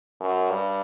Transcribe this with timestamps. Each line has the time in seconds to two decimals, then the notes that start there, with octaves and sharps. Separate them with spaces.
0.21 F#2
0.50 G2